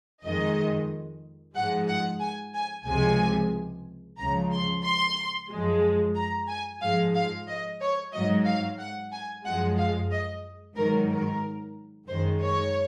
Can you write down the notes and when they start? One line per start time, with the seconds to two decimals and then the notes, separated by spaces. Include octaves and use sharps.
0.24 F2 D#3 G#3 D#5
1.54 G#2 F3 G#3 F#5
1.88 F#5
2.20 G#5
2.54 G#5
2.86 C#2 C3 F3 G#3 G#5
4.18 C#2 C#3 F3 A#5
4.51 C6
4.83 C6
5.50 F#2 F3 G#3
6.15 A#5
6.49 G#5
6.81 G#2 F3 G#3 F5
7.15 F5
7.48 D#5
7.81 C#5
8.13 G#2 F#3 D#5
8.46 F5
8.79 F#5
9.12 G#5
9.45 F#2 F3 G#3 F#5
9.77 F5
10.11 D#5
10.76 G#2 D#3 F#3 A#4
11.09 A#4
12.08 F#2 D#3 G#3 C5
12.41 C#5